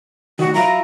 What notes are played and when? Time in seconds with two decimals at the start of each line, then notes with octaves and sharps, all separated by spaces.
0.39 D2 D#3 F#4
0.54 F#3 E4 F4 A#5